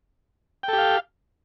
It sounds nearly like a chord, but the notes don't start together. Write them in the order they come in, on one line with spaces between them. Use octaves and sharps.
G5 A4 G4 F5